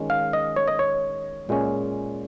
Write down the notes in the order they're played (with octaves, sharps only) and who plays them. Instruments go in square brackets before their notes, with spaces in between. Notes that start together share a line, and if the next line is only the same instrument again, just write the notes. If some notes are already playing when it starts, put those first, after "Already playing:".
Already playing: [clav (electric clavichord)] D#3 G#3 C#4
F5
D#5
C#5
D#5
C#5
A#2 G#3 C#4